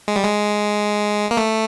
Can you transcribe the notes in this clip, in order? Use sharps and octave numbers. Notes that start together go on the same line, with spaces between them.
G#3
G3
G#3
A#3
A3